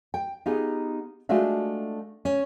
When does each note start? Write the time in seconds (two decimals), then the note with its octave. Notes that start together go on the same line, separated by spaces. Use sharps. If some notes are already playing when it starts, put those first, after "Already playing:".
0.14 G5
0.46 B3 D#4 F4 G4 G#4
1.29 G#3 A3 D4 F4 F#4 E5
2.25 C#4